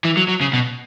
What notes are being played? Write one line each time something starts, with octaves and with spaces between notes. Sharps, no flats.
E3
F#3
F#3
C#3
B2